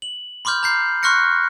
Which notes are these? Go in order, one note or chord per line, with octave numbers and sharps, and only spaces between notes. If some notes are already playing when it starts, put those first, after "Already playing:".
F#7
B5 C6 D6 F6 G6
A#5 G6 C7
C6 C#6 F6 F#6 A#6 C#7